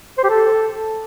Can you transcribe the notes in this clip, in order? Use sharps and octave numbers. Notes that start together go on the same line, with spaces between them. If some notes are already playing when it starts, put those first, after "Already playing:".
C5
G4
A4